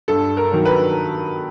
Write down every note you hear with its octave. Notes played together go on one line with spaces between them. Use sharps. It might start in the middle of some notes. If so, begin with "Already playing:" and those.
G2 A4
A#4
D#3 F#3
B4